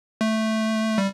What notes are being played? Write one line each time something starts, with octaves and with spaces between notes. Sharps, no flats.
A3
G3